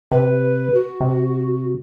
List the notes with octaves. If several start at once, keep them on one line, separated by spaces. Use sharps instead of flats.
C3 B4
F#4
C3